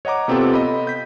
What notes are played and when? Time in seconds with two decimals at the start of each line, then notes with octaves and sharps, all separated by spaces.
0.05 C#5 D#5 F#5 A#5 D6
0.28 C3 B3 C4 F4 G4 A4
0.54 D#5 B5
0.87 G6 B6